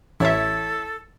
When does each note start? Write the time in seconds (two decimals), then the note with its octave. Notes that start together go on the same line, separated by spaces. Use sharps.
0.20 A1 E4 A4 C#5 E5